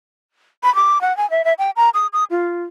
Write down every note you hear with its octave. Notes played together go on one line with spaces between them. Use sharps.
B5
D6
F#5
G#5
E5
E5
G5
A#5
D#6
D#6
F4